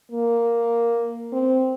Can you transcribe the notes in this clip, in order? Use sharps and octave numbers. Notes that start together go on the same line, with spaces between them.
A#3
C4